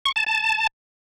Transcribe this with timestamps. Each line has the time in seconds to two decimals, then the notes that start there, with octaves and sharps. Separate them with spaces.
0.06 C#6
0.16 A5
0.26 A5